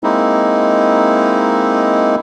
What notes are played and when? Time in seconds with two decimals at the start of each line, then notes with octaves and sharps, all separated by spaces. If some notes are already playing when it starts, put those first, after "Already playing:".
0.03 G#3 A#3 C4 D#4 E4